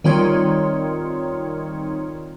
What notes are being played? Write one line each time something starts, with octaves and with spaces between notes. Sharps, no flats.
D#3 G3 C4 D#4 F4 C#5